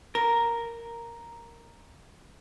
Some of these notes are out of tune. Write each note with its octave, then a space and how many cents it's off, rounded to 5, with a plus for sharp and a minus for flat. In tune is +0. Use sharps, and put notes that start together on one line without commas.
A#4 +0